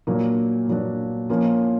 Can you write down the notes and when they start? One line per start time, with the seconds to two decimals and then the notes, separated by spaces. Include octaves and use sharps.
0.07 A#2 F#3 A#3 D4
0.67 A#2 F#3 A#3 D4
1.29 F3 A#3 C#4